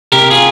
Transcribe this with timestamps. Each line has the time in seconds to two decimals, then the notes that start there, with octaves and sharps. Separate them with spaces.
0.12 C3 G4 A#4
0.30 F4 G#4